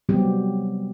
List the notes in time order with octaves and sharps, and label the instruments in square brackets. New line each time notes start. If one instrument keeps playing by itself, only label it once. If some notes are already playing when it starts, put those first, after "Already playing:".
[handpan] C3 F#3 G3 B3 C4 G4